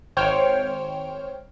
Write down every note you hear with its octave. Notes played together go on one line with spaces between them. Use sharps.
G#1 C5 C#5 G5 F6 D7